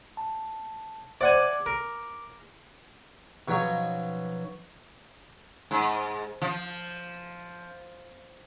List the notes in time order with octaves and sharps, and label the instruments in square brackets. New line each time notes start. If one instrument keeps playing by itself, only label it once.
[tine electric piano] A5
[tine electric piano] C5 E5 D6 [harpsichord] D5 F#5 G#5
[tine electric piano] D6
[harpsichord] A#4
[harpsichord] B2 F#3 [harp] F3 C#4 D#4
[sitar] G#2
F3